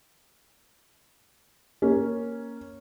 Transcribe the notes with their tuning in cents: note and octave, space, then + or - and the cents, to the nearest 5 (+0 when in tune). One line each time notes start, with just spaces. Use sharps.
A#3 +0 C#4 +0